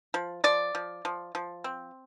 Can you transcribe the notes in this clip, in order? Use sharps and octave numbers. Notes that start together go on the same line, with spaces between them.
F3
F3 D5
F3
F3
F3
C4